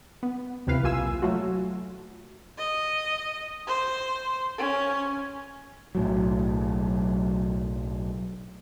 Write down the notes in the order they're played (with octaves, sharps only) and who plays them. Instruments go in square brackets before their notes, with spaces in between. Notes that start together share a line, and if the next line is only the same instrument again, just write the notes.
[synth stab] B3
D#2 C3 C4 E4 B4 F5
B1 C3 A#3 F4 G#5 E6
F#3 A3 F4 F#4
[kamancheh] D#5
C5
C#4
[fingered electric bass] B1 A2 F#3